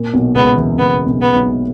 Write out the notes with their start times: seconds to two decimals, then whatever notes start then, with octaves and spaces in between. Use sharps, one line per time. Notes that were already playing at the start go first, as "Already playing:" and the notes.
Already playing: A#2
0.13 B1 B2
0.35 C#2 C#3 B3
0.56 E2 E3
0.78 C#2 C#3 B3
1.06 B1 B2
1.22 B3
1.35 B1 B2